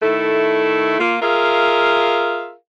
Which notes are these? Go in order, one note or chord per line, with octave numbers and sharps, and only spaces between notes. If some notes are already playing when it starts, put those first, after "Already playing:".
D#3 A3 E4 A4
A#3 F4
F4 G#4 A#4 E5 F5